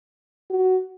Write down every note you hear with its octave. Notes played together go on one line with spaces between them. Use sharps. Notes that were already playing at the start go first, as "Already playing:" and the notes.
F#4